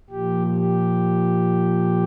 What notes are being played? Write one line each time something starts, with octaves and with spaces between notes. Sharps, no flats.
A#2 F3 G4
G4